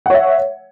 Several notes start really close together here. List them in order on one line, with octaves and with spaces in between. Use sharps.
F#5 C#5 E5